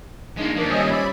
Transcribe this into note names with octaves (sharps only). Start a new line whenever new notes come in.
G#3 A#3 D4 D#4
D#2 F3 D4 A#4
G3 C#4 C5 D#5 E5 G#5
D5 E5 B5